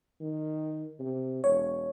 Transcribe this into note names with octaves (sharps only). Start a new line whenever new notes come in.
D#3
C3
E1 C#5